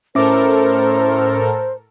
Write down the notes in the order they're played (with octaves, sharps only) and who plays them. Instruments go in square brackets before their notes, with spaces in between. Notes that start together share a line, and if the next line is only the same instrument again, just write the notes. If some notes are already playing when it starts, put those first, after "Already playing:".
[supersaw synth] A2 A4 A#4 [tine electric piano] C#4 E5 D6 [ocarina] C5